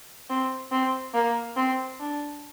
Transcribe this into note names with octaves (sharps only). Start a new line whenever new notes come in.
C4
C4
A#3
C4
D4